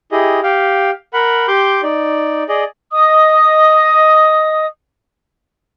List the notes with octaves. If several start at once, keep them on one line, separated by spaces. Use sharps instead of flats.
E4 G4 G#4 D#5
G4 F5 G5
A#4 F#5 B5
G4 C6 D6 G6
D#4 D5
G#4 D5 D#5
D#5 D#6